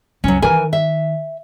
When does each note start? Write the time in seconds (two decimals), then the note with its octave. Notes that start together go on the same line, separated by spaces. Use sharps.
0.24 C#2 F#2 F#3 C#4
0.42 D#3 E3 A#4 G#5
0.73 E5